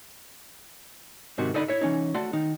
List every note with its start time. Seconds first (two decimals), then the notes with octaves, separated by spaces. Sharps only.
1.38 G#2 C3 D#3 F#4
1.54 D3 D#4 D5 D#5 B5
1.68 E4 C#5 E5
1.81 E3 C#4 D#4
2.14 A3 F#4 D5 F#5 C6
2.33 D#3 D#4